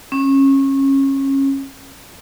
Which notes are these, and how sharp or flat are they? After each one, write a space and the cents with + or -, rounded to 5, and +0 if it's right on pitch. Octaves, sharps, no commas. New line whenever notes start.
C#4 -25